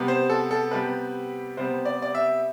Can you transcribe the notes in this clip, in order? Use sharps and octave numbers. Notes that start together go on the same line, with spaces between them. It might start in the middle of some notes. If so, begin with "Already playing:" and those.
Already playing: C3 G3 B3
C5
A4
A4
C3 G3 B3 B4
C3 G3 B3 C5
D5
D5
E5